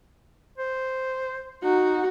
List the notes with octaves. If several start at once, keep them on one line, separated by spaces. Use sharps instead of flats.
C5
D#4 F#4